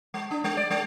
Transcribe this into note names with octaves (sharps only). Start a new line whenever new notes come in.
G#3
D4
G#3
D5
G#3